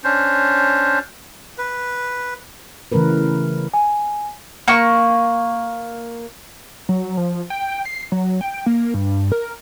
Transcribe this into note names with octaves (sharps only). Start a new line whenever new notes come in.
C#4 D4 C5
B4
C#3 E3 A3 C#4 A#4 B4
G#5
A#3 C#6
F#3
F3
G5
C7
F#3
G5
A#3
G2
A#4